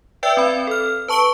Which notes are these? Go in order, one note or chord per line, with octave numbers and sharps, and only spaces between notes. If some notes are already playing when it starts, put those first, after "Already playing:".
B4 D5 E5 G5 E6
C4 B5
A4 F6
B4 A5 C#6 D7 G7